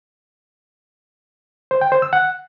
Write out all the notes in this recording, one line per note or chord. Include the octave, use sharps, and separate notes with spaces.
C5
G5
C5
E6
F#5